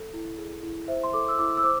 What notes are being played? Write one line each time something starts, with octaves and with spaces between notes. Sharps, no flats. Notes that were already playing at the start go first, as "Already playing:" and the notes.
Already playing: A4
E4
G#4
E4
C5 E5
C6
A4 D6
E6
E4 D6
E6
C5 D6